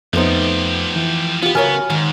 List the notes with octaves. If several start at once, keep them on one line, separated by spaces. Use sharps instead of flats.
F2 F3 A3 B3 D#4 G4 C5
E3
B3 F4 G4
C#3 F#4 A#4 C#5 G#5 F6
G#2 D#3